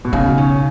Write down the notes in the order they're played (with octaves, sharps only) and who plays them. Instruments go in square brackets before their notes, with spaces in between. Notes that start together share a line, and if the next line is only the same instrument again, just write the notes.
[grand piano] B2
[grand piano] C#3 [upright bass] D#4
[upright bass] C#4